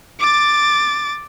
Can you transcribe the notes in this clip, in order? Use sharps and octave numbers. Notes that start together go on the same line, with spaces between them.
D6 A6